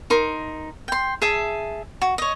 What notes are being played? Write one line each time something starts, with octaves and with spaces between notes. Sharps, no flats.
D#4 A#4 C6
G5 C6
G#4 E5 A5
F#4
C#5 D#5